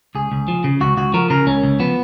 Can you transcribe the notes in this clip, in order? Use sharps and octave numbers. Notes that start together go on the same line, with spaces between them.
C#2 G#4
C#2
F3
C#3
C#2 F#4
C#2 F#4
F3 A#4
C#3 A#4
C#2 C#4
C#2
F3 B3